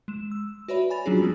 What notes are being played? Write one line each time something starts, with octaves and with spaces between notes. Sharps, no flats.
G#3 E7
E6
F#4 B4 C#5 D5 E5 B5
G#5 B5 A6 F7
F#3 C#4 D4 F4 F#4 G#4
F3 G3 B3 C4 D4